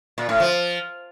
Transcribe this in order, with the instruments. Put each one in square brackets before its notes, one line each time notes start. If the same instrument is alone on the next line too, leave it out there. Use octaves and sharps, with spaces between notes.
[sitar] A#2
A2
F3